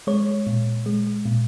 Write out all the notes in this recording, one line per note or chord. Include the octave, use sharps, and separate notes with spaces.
G#3 C#5
A#2
G#3
A#2